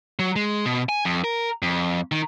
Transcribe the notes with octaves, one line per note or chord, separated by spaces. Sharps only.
F#3
G#3
B2
G#5
F2
A#4
F2
D#3